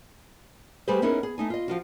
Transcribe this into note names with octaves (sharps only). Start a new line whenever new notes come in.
G3 A3 G4 G#4 B4 C5
B3 C#4 D#4 E4 G#4 A#4
G#4
A3 D#4 G#5
F4 D#5
F3 F4 F#4